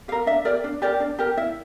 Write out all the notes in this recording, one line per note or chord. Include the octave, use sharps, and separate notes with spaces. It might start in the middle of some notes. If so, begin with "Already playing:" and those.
G4 A#4 F5
D4 E5
G4 A#4 D5
D4
G4 A#4 D5
D4
G4 A#4
E4 E5